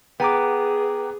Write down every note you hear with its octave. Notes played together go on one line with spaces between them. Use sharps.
B3 G#4 G5 A#5 D6